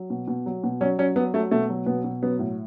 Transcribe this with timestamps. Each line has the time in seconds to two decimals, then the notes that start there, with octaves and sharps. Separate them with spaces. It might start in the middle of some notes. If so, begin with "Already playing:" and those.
Already playing: F#3
0.10 B2
0.28 B2
0.46 F#3
0.64 B2
0.81 F#3 C#4
0.98 F#3 C#4
1.16 F#3 B3
1.34 F#3 A3
1.51 B2 A3
1.69 F#3
1.86 B2 B3
2.04 B2
2.22 F#3 B3
2.39 A2